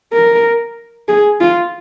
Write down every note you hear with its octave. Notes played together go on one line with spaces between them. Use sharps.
A#4
G#4
F4